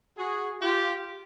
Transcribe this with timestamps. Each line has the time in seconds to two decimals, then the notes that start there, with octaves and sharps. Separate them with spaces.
0.18 F#4 G#4
0.62 F4 G4